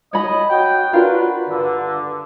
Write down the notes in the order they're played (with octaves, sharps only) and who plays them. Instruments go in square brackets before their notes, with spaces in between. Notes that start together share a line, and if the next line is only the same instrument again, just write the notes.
[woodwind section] D#4 F#4 D#5 [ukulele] C#5 B5
[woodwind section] F#4 F#5 G5
[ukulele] D4 F4 A#4 [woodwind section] F#4 B4
[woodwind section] G2 D3